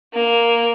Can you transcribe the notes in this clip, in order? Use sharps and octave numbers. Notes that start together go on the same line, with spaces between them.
A#3